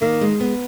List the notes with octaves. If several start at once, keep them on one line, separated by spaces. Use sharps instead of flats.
D#3 A#3
G#3
B3